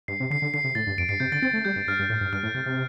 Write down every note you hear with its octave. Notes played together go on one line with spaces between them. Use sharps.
G2 C7
C3
D3 C7
D3
D3 C7
C3
A2 A6
G2
F2 D7
G2 C7
C3 G6
D3 A6
C4 A6
A3
G3 G6
G2
G2 F6
G2
A2
G2
G2 F6
A2
C3
C3